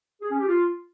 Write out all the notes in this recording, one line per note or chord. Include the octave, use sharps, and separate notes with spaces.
G#4
C#4
G4
F4